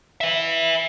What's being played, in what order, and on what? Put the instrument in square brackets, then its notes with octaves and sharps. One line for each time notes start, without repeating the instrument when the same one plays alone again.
[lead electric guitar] B4 E5